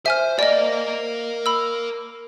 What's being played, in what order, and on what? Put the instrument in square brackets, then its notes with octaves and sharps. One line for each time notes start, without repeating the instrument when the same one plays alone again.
[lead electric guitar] C5 [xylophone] E5 G#5 F6
[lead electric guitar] A#4 F5 [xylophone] D5 D#5
[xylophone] B5 E6